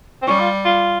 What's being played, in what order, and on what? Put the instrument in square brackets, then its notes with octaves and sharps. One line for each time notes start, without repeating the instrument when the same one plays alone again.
[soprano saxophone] C4
[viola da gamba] G3 [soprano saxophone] C#4
[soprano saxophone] F4
F4